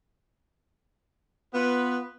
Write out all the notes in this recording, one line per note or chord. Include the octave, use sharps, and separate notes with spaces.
B3 F4 B4